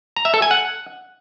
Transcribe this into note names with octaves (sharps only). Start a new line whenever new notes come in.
A#5
E5
A4
G#5
F#5